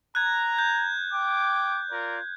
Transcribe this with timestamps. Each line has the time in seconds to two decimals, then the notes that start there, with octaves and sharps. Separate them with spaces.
0.15 A#5 F#6 G#6
0.59 G6
1.11 G5 D6
1.90 F4 A#4 D5